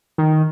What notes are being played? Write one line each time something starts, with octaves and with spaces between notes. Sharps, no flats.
D#3